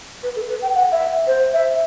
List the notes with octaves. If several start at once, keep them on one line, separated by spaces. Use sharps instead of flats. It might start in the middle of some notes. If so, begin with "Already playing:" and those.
B4
A4
B4
G5
F#5
E5
C5
E5